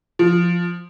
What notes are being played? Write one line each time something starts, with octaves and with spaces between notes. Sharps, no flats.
F3